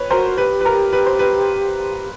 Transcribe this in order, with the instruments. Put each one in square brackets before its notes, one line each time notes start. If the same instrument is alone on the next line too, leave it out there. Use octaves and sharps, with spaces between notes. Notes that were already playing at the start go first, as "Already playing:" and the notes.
Already playing: [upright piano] B4 C#5
[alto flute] F#4 [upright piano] A#4 C5
[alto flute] G4 [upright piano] B4
[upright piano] B4
A#4
B4
C5
B4